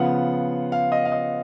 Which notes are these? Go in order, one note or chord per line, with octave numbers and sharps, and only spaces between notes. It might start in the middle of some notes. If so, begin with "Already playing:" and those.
Already playing: C#3 F3 B3 F4 F#5
F5
D#5
F5
D#5